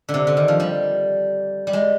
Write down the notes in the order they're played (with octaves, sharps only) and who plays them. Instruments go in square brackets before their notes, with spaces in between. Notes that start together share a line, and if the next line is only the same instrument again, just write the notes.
[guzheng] D3
C3
D3
D#3
F3
G3
G3
G#3